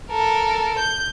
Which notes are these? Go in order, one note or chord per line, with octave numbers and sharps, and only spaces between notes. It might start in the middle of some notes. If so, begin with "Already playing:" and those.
A4 A#4
G6